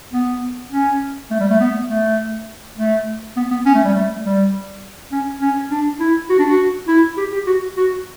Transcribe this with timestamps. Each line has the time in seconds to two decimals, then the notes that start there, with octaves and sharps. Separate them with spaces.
0.13 B3
0.72 C#4
1.31 A3
1.40 G3
1.50 A3
1.60 B3
1.90 A3
2.77 A3
3.37 B3
3.51 B3
3.66 C#4
3.75 A3
3.85 G3
3.95 A3
4.25 G3
5.12 C#4
5.42 C#4
5.71 D4
6.00 E4
6.30 F#4
6.39 D4
6.50 F#4
6.88 E4
7.18 G4
7.32 G4
7.47 F#4
7.77 F#4